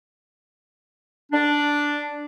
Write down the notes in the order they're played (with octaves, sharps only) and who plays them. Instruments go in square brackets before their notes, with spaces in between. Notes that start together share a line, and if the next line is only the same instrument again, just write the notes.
[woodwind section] D4